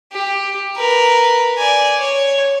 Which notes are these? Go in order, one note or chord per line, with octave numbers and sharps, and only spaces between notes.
G4
A#4 B4
D5 G#5
C#5